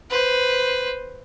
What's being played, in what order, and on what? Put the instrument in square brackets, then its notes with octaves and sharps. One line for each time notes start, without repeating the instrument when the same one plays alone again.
[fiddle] B4 C5